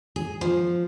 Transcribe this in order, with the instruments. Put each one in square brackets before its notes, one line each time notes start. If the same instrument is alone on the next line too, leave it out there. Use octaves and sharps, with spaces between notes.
[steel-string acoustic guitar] G#4
F3